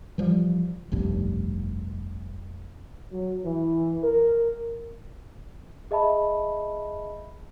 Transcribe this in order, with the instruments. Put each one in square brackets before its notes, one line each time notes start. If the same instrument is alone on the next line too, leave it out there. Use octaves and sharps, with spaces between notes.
[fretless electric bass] E3 F3 G3
F1 B1 G2
[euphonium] F#3
E3
A#4
[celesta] G#4 D#5 E5 A5 B5